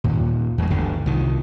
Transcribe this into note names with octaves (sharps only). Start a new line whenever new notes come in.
D#2 A#2
E2 G#3
G1 D2 G2 D3
C2 D#3